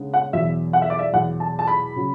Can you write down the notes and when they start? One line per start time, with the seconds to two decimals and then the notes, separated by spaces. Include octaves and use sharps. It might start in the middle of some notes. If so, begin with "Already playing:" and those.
Already playing: C#3 G#3 B3 D4
0.14 F#5
0.33 E2 B2 F#3 E5
0.73 F#5
0.82 E5
0.90 D5
0.99 E5
1.14 E2 B2 F#3 F#5
1.40 A5
1.59 A5
1.67 B5
1.96 C#3 F#3